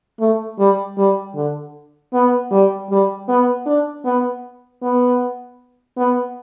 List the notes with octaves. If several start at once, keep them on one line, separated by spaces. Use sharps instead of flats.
A3
G3
G3
D3
B3
G3
G3
B3
D4
B3
B3
B3